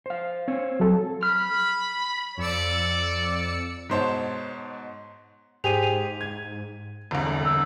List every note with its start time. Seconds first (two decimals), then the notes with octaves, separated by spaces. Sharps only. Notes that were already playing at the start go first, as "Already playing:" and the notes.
0.06 C5 F5
0.48 C4 C5 C#5
0.80 F#3 A4
1.23 B5 F6
2.37 F2 D5 E6 C#7
3.89 G#2 B2 C5 C#5 A5
5.64 G#2 G4 G#4 C5 D#7 F7
5.83 D#7
6.21 G#6
7.11 E1 C2 D3
7.45 E6